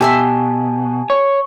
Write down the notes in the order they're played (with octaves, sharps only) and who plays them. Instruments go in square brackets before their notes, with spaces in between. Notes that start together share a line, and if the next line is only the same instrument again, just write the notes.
[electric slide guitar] B2 [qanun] G4 E5 C6 [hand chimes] G#5 A5
[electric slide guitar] C#5 [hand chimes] C#6